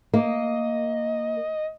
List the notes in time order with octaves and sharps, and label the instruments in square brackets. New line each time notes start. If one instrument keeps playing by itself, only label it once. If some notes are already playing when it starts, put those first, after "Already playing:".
[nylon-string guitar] A#3 [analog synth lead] D#5